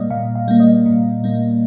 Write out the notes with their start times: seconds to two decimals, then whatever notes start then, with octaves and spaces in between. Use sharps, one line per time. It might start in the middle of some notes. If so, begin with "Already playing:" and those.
Already playing: A#2 G3 A#3 D5 D#5 F5
0.11 A#2 F5
0.35 F5
0.48 G3 A#3
0.60 D#5
0.86 A#2
1.24 G3 A#3